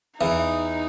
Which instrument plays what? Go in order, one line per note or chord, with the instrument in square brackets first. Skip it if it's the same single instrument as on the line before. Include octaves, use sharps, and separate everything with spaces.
[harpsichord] E2 E3 [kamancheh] D#4